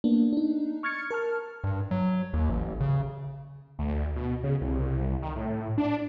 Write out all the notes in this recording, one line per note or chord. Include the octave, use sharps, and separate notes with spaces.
A#3 B3 D4
D4 D#4
C#6 F6 G#6 A6 C#7
A#4 A5 F6
G2
F#3
D#2
A1
C#3
D2
B2
C#3
C2
D#3
A2
D4